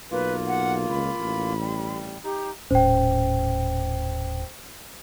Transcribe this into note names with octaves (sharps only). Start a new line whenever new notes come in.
B1 A#3 F4 B4
F#5
C#2 B5
A1
G3
D#4 G4
D#1 A2 C#4 C5 G5